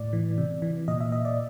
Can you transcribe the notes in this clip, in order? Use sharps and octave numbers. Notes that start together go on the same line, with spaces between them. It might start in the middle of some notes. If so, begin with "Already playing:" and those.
Already playing: A2 D5
E3
C3
E3
A#2 D#5
E5
D#5
D5